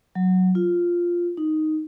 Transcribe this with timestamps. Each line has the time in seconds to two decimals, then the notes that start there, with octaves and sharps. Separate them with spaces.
0.15 F#3
0.55 F4
1.37 D#4